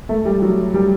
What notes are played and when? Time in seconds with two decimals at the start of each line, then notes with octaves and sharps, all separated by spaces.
0.09 A3
0.25 G3
0.42 F#3
0.74 G3